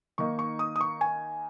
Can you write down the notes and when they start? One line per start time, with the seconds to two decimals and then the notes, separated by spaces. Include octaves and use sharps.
0.18 D#3 A#3 D#4 C#6
0.39 C#6
0.59 D#6
0.76 D#6
0.81 C#6
1.01 G#5